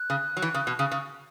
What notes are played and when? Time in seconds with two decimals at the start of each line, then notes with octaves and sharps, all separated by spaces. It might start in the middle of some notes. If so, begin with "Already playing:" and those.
Already playing: F#6
0.10 C#3
0.37 F#3
0.42 E3
0.54 C#3
0.67 B2
0.79 C#3
0.91 C#3